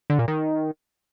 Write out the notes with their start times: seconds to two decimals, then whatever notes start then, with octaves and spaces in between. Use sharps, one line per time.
0.10 D3
0.19 A#2
0.28 D#3